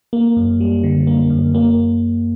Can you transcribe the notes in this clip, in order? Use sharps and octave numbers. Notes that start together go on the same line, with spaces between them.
A#3
F#2
G3
D3
A#3
F#2
A#3